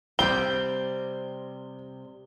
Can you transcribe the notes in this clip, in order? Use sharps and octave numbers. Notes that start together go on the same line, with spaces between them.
C3 G3 C4 G4 G7